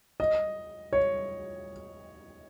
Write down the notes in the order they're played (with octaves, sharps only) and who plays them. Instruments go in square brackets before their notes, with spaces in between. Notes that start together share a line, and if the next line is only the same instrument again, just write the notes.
[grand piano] D#5
C#5